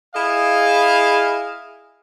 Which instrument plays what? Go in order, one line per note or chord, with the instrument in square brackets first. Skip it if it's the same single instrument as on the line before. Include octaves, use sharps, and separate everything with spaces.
[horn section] E4 G#4 D#5 F5